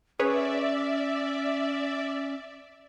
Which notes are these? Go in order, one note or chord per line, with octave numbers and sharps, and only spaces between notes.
C#4 G#4 B4 C#5 D5 E5